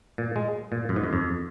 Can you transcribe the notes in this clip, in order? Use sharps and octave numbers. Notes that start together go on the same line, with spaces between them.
A#2
G#3
A#2
F#2
G#2
F#2
F2